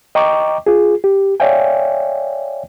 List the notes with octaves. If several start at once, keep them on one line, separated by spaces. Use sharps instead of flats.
D#5 G5 A#5 C#6 D6
F4 G#4
G4
C#5 D5 E5 F5 G5 G#5